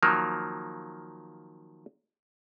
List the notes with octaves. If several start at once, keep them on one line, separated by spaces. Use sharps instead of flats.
D#3 F3 F#3 A#3